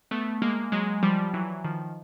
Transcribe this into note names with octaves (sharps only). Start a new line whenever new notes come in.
A3 B3
G#3 A#3
F#3 G#3
F3 G3
E3 F#3
D#3 F3